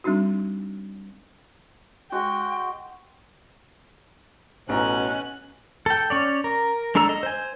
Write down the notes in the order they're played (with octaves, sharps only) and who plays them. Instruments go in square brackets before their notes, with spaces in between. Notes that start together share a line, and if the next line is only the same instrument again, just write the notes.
[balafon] G3 C4 D4 D#4 F#4
[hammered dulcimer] G#3 F#4 [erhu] G5
[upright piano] A1 D#4 A#5 [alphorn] B2 [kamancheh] C#4 F#6
[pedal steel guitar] A4 G5
C#4 C#5 D5
A#4
G#3 D4 A4 A#5 E6
D#5
C5 G#5